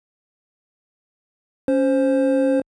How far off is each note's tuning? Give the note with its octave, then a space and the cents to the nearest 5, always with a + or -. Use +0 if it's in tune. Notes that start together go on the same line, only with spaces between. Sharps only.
C#4 +0 C5 +5